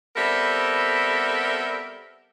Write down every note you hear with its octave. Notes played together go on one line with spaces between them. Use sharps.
G3 B3 C4 A4 A#4 E5